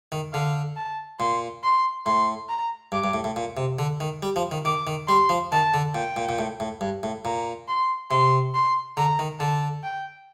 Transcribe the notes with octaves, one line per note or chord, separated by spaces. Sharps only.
D#3
D3 F5
A5
A#2 C6
C6
A2 C6
A#5
G2 D6
G2
A2
A2
A#2
C3
D3
D#3
G3
F3
D#3
D#3 D6
D#3
G3 C6
F3
D#3 A5
D3
A#2 G5
A#2
A#2
A2
A2
G2
A2
A#2 A#5
C6
C3 C6
C6
D3 A#5
D#3
D3 A5
G5